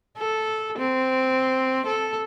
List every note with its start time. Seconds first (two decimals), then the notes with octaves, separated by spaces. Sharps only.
0.17 A4
0.78 C4
1.86 A4